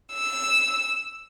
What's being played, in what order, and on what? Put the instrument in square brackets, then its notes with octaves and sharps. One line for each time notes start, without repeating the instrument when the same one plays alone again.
[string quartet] E6